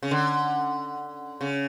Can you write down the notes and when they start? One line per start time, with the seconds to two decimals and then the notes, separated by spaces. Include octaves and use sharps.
0.03 C#3
0.11 D3
1.41 C#3